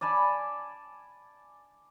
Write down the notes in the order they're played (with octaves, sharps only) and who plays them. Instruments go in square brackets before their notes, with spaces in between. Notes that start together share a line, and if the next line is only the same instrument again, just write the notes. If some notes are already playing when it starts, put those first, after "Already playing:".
[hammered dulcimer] D5 G#5 A5 B5